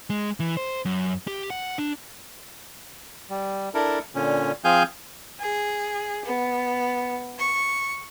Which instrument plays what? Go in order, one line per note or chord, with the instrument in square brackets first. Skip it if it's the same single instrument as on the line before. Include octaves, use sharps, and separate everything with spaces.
[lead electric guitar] G#3
E3
C5
F#2
G4
F#5
D4
[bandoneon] G3
D4 E4 A4 A#4
A#2 D3 C#4
F3 C4 G#4 F5 G#5 G6
[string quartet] G#4
B3
C#6